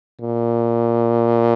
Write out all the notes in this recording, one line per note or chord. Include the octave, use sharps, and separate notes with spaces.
A#2